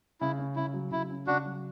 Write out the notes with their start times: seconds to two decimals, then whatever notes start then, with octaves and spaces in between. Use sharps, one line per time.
0.21 C#3 E4
0.39 C#4
0.56 C#3 E4
0.73 F#3
0.91 C#3 E4
1.10 C#4
1.27 C#3 D4 F#4
1.45 F#3